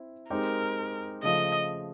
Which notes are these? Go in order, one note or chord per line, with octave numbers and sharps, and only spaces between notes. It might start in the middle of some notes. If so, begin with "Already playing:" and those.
Already playing: C4 E4
G#3 C4 D#4 G4 A#4
C#3 F3 A3 D#5